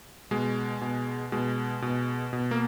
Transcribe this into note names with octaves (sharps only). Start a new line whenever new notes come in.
B2 G#3
B2
B2 G#3
B2
B2
A#3